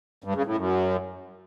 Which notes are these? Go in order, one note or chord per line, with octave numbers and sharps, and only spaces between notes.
G2
C#3
A2
F#2